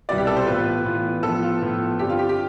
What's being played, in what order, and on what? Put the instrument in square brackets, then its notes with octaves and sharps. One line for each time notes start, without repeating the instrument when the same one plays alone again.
[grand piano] C2 B2 G3 B3 E4 [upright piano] D5
[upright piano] G4
A4
C5
[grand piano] A2 E3 B3 F4 [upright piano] B4
[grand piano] A2 E3 B3 F4
[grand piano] A2 F3 B3 [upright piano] A4
[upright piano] F4
[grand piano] A2 F3 B3
[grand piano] G2 D3 G3 C4 [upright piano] G4
[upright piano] F4
G4
G4